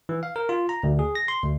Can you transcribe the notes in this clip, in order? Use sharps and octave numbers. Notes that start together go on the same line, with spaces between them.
E3
F5
A#4
F4
A#5
D2
G#4
A#6
C6
D2